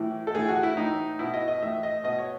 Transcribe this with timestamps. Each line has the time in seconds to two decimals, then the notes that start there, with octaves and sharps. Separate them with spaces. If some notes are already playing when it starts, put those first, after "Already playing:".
Already playing: A2 E3
0.27 A4
0.35 A2 E3 G#4
0.48 F#4
0.63 E4
0.77 A2 E3 D#4
1.19 B2 E4
1.34 D#5
1.48 D#5
1.62 A2 E3 E5
1.83 D#5
2.04 B2 D#5
2.18 C#5